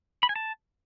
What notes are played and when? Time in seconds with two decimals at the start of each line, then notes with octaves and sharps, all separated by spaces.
0.23 B5
0.29 G#5
0.36 A5